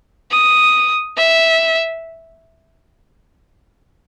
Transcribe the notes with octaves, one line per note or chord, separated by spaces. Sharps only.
D#6
E5